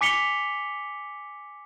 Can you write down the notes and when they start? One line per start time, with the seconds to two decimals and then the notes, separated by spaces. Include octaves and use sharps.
0.01 G#5 D6 B6 C#7 F7 G7